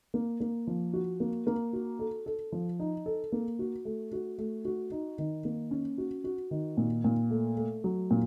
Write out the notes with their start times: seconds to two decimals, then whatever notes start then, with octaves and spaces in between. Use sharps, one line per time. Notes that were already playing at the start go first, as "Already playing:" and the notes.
0.14 A#3
0.40 A#3
0.67 F3
0.93 F#4
1.20 A#3
1.47 A#3
1.73 F#4
1.99 A4
2.26 A4
2.52 F3
2.80 D#4
3.06 A4
3.32 A#3
3.59 F#4
3.85 A3
4.12 F#4
4.38 A3
4.65 F#4
4.92 D#4
5.18 D#3
5.45 A#3
5.71 C#4
5.98 F#4
6.24 F#4
6.51 D#3
6.77 A#2
7.04 A#2
7.31 A3
7.57 A3
7.84 F#3
8.11 A#2